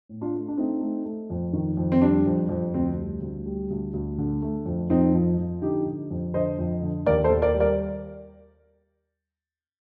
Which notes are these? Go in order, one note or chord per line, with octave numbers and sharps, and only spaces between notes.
A2
D4 F4
A3
D4
A3 C4 D#4
A3
A3
F2
D#3
F2
C4
G3 D4
F2
F2
D2 C4
G3
D2
G3
D2
D2
D3
A3
F2
F2 C4 D#4
F3
F3
D3 D#4 G4
D3
F2
D3 C5 D#5
F2
D3
D#2 A#4 D5
A4 C5
D#2
A#4 D5
G3
A#4 D5